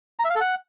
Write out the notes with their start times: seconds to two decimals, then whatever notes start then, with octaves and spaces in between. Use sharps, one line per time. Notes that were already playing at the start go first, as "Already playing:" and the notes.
0.19 A#5
0.25 E5
0.30 F5
0.35 A4
0.41 F#5